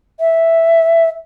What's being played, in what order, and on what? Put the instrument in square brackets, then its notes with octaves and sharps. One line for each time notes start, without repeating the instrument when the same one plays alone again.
[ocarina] E5